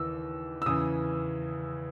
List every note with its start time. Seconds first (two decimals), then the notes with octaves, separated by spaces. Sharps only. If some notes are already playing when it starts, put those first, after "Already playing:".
Already playing: D#2 C#3 E3 E6
0.62 E6
0.66 E2 C#3 E3 D#6